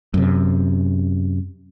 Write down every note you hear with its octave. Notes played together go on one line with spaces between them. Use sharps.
F#2 C3